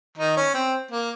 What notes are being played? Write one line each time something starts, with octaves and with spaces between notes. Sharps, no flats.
D#3 D#4
C#4
C4
A#3